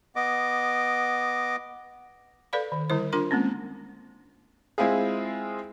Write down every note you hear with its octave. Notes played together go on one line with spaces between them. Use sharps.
B3 D#5 D6
A4 B4 D5 F5 B5
D#3
D3 G3 E4 C5
D4 F4 A#4 C6
G#3 A#3 C4 C#4
G#3 C4 E4 F4 G#4